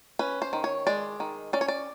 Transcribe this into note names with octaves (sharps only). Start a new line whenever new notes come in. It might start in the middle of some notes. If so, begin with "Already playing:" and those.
C#4 B4
C5
D#3
C#5
G#3 D5
D#3
C#4 D5
C#5
D5